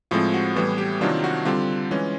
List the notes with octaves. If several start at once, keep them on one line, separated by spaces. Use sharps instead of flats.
A2 F3 G#3 C4 F4
F#4
A2 E3 G3 B3
G4
C3 D#3 F#3 A#3 D4 F4
F#4
D3 G3 C4 F4
E3 G#3 C#4